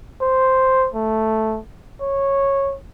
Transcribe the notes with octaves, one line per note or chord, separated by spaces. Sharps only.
C5
A3
C#5